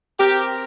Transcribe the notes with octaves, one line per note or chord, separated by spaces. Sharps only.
C4 G4 A#4